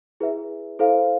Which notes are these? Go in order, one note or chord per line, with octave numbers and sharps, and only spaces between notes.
E4 G#4 B4 E5
E4 A4 C5 F5